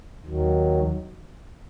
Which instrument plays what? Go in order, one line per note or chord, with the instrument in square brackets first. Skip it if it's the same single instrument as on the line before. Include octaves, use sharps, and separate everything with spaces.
[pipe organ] D#2 D#3 F#3